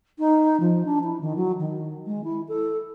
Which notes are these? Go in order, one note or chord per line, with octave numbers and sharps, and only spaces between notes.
D#4
F3
D4
E4
D#3
F#3
D#3
G#3
E4
A4